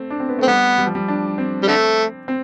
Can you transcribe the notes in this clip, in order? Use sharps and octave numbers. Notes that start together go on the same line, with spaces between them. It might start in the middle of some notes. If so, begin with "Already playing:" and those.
Already playing: A3 C4
D4
C4
B3
A3 C4
G3 B3
G3
F3
G3
D4
C4
G3
D3 A3
C4